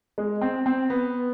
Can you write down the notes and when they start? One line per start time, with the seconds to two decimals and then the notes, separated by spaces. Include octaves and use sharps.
0.18 G#3
0.41 C4
0.66 C4
0.90 B3